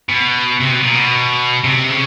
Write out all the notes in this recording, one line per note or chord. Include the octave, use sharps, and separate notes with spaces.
B2
C3
B2
A#2
B2
C3
C#3